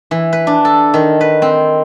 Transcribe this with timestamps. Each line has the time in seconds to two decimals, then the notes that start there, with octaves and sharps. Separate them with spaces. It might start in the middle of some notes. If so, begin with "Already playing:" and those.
0.11 E3
0.33 B4
0.47 D4
0.65 A4
0.94 D#3
1.21 B4
1.42 C4